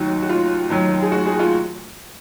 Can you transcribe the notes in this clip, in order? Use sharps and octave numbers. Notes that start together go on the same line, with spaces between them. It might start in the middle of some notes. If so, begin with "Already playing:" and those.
Already playing: D#2 D#3 F#3 F#4
F#4
F4
D#2 D#3 F#3
G#4
F#4
G#4
F4